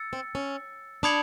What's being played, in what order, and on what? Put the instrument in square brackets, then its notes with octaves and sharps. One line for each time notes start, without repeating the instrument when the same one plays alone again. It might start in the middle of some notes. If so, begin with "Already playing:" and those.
Already playing: [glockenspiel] E6 A6 C#7
[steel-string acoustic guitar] C4
C#4
[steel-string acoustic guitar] D4 [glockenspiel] B5 D#6 G#6 C#7 F#7